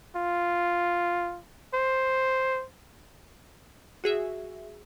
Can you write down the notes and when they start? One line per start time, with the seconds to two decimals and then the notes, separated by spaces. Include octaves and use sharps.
0.16 F4
1.74 C5
4.04 F#4 G#4 E5